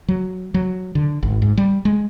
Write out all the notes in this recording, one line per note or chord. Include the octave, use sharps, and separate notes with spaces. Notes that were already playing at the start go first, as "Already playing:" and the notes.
F#3
F#3
D3
G#1
G#2
G3
G#3